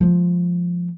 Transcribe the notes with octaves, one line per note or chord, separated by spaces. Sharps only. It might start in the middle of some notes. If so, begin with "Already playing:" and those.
F3 G#3